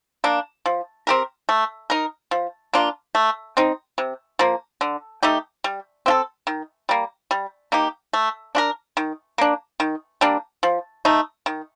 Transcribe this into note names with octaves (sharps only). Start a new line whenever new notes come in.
A#3 D4
F3
C4 G4 A#4
A3
D#4 A#4
F3
A#3 D4 F4
A3
C4 D#4
C3
F3 A#3
D3
A3 D#4 G4
G3
C4 F4 A4
D#3
G3 A#3
G3
A#3 D#4 G4
A3
D4 F4 A#4
D#3
A#3 D4
D#3
G3 A#3 D4
F3
A3 D#4
D#3